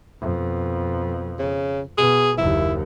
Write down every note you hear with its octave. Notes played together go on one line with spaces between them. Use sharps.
F2 B2
C#3
B2 G#4
F#1 D#2 E4